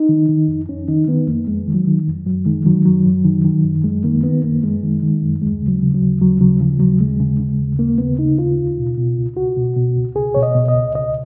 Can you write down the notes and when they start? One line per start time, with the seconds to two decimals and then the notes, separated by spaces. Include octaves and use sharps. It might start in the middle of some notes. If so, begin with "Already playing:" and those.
Already playing: D#4
0.09 D#3
0.29 D#3
0.48 F2
0.69 F2 C#4
0.88 D#3 D#4
1.07 D#3 B3
1.28 F2 A#3
1.47 F2 G#3
1.67 D#3
1.74 F#3
1.87 D#3
2.07 F2
2.26 F#2 F#3
2.46 D#3 G#3
2.65 D#3 F#3
2.85 F#2 F#3
3.05 F#2
3.25 D#3
3.45 D#3
3.64 F#2
3.84 F#2 G#3
4.04 D#3 A#3
4.23 D#3 B3
4.43 F#2 A#3
4.63 F#2 G#3
4.83 D#3
5.03 D#3
5.22 F#2
5.42 D#2 G#3
5.62 C#3
5.68 F#3
5.82 C#3
5.94 F#3
6.01 D#2
6.21 D#2 F#3
6.40 C#3 F#3
6.60 C#3 F3
6.80 D#2 F#3
7.00 D#2 G#3
7.20 C#3
7.40 C#3
7.59 D#2
7.79 D#2 A#3
7.98 C#3 B3
8.18 C#3 D#4
8.38 D#2 F4
8.58 C#2
8.78 B2
8.98 B2
9.17 C#2
9.37 C#2 F#4
9.57 B2
9.76 B2
9.96 C#2
10.15 C#2 G#4
10.35 B2 C#5
10.43 D#5
10.55 B2
10.68 D#5
10.75 C#2
10.95 C#2 D#5